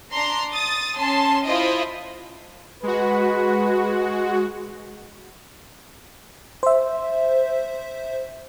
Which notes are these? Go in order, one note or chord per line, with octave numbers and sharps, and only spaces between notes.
D4 A#5 C6
D#6 A6
C#4 A5 C6
E4 F4 C5 D#5
G#3 F#4 B4
C5 E5